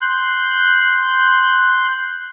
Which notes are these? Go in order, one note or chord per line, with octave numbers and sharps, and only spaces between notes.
C6 F#6 G6